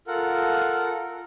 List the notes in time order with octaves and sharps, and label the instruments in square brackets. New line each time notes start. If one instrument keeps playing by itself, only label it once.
[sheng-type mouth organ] F4 A4 A#4 F#5